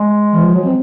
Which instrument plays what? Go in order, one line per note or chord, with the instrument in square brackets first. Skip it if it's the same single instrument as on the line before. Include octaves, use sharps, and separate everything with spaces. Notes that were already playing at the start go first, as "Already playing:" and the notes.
Already playing: [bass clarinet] G#3
[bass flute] E3
F3
F#3
C4